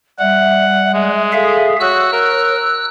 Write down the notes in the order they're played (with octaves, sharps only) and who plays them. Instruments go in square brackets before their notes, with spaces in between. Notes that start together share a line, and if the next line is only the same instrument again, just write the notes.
[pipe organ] G3 [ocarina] E5 [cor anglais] F#5
[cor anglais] G#3 [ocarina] E5
[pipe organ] G#4 E5 F5 [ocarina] A4
[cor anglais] F#4 [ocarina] C#5 [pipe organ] E6 F#6
[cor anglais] A#4